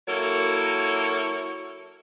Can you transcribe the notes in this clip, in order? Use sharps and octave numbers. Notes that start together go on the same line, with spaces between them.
F#3 A#3 E4 A4 A#4 C#5